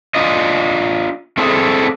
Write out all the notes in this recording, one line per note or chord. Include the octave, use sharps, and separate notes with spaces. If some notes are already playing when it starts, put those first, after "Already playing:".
D4 F4 D#5
A3 C4 D4 E4 G#4 A4